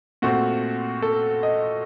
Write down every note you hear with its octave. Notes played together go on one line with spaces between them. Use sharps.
A#2 A3 C4 F#4
A4
D#5